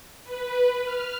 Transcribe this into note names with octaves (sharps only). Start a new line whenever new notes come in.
B4
F6